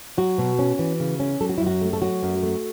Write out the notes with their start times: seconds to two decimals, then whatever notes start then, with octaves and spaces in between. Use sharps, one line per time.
0.17 F#3 F#4
0.38 B2
0.59 C#4
0.79 E3
1.00 C#3
1.20 C#4
1.40 F#3 A4
1.49 F#4
1.58 E4
1.62 F#2 F#4
1.82 A3
1.93 A4
2.02 F#3 F#4
2.23 F#2
2.43 A3